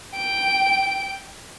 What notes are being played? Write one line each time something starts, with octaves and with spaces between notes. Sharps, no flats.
G5 D7